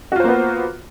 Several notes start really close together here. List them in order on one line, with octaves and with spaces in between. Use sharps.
F#4 F4 C5 A#3 B3